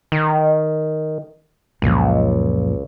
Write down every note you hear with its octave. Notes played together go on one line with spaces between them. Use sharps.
D#3
C#2 F#2 A#2 F3